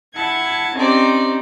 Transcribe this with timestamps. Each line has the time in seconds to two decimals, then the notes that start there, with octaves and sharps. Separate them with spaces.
0.15 E4 F#5 A5 G#6
0.75 C4 C#4 D#4 G4 C5 D5